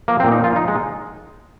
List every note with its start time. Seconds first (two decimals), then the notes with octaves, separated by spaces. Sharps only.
0.08 F3 A#3
0.20 C4
0.24 A#2
0.32 D#4
0.40 F3 F4
0.56 F3 D#4
0.68 G#3